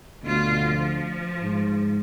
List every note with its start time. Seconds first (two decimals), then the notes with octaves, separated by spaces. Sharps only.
0.23 D2 B2 F4
0.67 F3
1.40 G#2